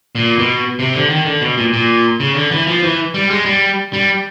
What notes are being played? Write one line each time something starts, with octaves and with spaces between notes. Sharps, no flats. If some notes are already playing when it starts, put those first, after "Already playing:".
A#2
B2
C3
D3
D#3
D3
B2
A#2
A#2
C#3
D3
E3
F3
E3
G3
G#3
G3
G3